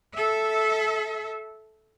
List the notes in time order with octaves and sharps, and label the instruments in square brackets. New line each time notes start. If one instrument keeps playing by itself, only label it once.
[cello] A4 E5